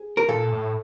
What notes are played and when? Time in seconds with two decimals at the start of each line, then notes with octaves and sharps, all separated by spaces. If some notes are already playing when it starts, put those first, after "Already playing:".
Already playing: G#4
0.17 A#4
0.29 A#2 A4
0.52 A2